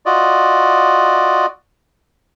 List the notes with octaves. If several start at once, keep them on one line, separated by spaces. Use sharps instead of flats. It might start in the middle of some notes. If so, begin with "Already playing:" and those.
F4 F#4 D5 D#5